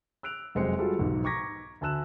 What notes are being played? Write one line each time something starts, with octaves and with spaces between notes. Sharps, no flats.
E6 F#6 D7 F7
F1 F#2 G#3 C4 C5 C#7
F#3 G3 F4 G#4 A4
B1 G#2
A#5 C#6 D6 G#6 A#6 B6
D2 G#5 A5 E6 F#6 E7